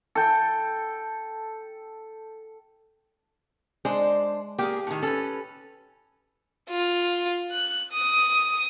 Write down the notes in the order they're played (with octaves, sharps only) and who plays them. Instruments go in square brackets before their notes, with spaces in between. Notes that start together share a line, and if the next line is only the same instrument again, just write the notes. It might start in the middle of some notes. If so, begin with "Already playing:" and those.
[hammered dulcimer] A4 G5
[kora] G#3 [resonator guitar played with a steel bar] D4 C5
[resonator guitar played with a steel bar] A#3 G#4 [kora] G4
[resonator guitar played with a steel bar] A2 D#3
[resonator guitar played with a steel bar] C#4 B4 [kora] A4
[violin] F4
F#6
D#6